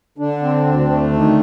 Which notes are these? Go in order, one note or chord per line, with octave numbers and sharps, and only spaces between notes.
D3 D4
C4
D2
A3
D#3